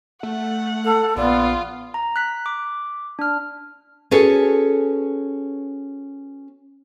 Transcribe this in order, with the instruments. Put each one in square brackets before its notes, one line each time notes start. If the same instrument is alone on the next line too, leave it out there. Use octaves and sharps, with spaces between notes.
[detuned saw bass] A3 [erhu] F#5
[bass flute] A4
[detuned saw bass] A#1 [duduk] B3 [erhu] F4 [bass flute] D5
[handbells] A#5
F#6 B6
D6
D4 F6
[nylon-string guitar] C#4 F#4 G#4 A4 B4 C#5